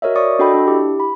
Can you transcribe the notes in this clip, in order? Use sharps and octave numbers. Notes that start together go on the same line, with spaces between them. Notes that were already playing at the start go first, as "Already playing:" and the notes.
F#4 A#4 C#5 D#5 E5
D5 C#6 D#6
D4 F#4 A4 D#5 G5 B5
D4
E4 G4
B5